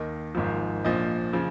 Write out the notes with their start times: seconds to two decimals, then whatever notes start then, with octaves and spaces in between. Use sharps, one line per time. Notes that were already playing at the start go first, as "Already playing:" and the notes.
Already playing: D#2 D#3 D#5
0.35 G#1 G#2 F3
0.85 A#1 A#2 F3 D#5
1.33 C#3 F3